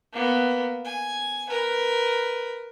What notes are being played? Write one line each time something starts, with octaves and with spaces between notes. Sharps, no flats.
A#3 B3
G#5
A#4 B4